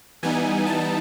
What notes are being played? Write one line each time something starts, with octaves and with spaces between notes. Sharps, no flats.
E3 G3 B3 D#4 G#5
A5